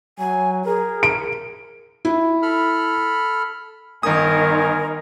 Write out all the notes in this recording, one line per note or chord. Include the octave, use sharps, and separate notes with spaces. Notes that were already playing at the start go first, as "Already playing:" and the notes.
F#3 G#5
G#4 A#4
D7
E4
A4 B5 F6
G1 D#3 A#4 G#5 D#6